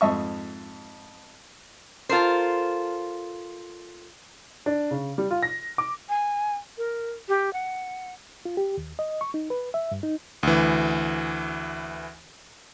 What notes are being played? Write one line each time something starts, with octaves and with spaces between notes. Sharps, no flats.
F2 G#2 D#5 E5 A5 C#6
F4 A4 A#4 C5
D4
C#3
G3
F4
A#6
D6
G#5
A#4
G4
F#5
F4
G4
D#2
D#5
C#6
D#4
B4
E5
G2
D#4
D2 E3